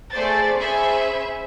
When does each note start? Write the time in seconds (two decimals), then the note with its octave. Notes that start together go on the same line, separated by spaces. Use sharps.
0.13 A3 G#4 C5 D5 A6
0.58 C#4 G#4 C5 E5 G#5 B5